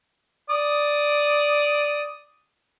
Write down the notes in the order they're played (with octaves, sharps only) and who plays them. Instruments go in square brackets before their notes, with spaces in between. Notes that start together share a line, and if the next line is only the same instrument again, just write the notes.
[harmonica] D5 D#6